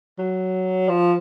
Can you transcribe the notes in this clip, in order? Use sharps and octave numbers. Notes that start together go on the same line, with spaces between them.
F#3
F3